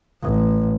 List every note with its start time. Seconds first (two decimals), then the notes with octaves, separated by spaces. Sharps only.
0.23 A1